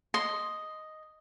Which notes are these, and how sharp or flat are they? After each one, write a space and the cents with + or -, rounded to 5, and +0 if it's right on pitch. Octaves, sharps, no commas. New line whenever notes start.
D#5 +0 C6 +0